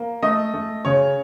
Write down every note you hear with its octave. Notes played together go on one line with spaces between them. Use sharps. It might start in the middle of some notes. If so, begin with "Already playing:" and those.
Already playing: A#3
A3 D#5
A3
C#3 C#5